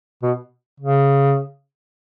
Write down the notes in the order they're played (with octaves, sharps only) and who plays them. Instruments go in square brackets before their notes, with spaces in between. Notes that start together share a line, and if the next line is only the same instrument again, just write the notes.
[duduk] B2
C#3